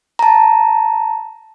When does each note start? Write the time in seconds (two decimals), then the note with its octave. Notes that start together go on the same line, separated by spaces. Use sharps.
0.19 A5 A#5